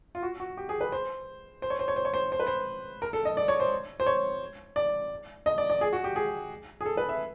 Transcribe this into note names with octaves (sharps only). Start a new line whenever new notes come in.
F4
F#4
F#4
G4
G#4
B4
C5
C5
C#5
C5
C#5
C5
C#5
C5
C5
B4
C5
A#4
A4
D#5
D5
C#5
C5
C5
C#5
D5
D#5
D5
D5
G#4
F#4
G4
G#4
G#4
A4
B4
E5